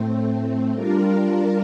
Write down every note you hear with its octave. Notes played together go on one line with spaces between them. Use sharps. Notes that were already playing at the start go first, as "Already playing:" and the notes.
Already playing: A2 A3 C4
G3 D4 F4 A#4